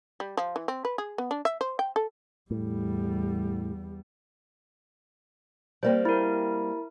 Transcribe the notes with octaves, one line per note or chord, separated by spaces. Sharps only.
G3
F3
E3
C4
B4
G#4
B3
D4
E5
C5
G5
A4
E2 A2 G3
G3 A#3 C4 C5
E4 A#4